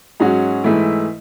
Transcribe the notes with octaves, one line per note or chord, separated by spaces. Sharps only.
G#2 F#3 C#4 F#4
G#2 E3 A3 E4